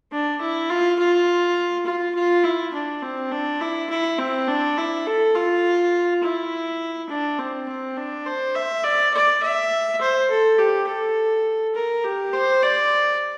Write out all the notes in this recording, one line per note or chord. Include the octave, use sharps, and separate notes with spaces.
D4
E4
F4
F4
F4
F4
E4
D4
C4
D4
E4
E4
C4
D4
E4
A4
F4
E4
D4
C4
C4
D4
C5
E5
D5
D5
E5
C5
A4
G4
A4
A#4
G4
C5
D5